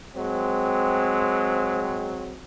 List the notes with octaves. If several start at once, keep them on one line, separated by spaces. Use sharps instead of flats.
F#3 G#3 C4